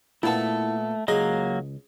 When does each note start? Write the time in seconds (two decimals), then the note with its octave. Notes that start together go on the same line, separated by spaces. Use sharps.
0.23 A#2 A3 B3 E4 A5
1.08 C#2 F#3 A#3 G#4 D#5